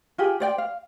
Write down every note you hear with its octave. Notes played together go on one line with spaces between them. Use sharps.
F4 G4 G#4
C5 D5 G5
F5